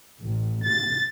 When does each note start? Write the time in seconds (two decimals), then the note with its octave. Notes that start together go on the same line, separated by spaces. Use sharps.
0.21 A1
0.64 A6